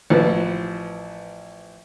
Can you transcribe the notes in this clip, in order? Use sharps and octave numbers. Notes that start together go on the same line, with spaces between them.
A1 F3 B4